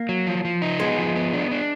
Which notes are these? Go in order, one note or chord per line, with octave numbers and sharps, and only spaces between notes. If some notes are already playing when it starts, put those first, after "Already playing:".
Already playing: A#3
F#3
F3
F3
D#4
G#3 B3
F3
B3
D4
D4